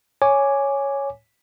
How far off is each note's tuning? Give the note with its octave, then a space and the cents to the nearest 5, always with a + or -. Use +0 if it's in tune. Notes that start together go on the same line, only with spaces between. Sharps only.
C#5 +0 G#5 +0 D6 +0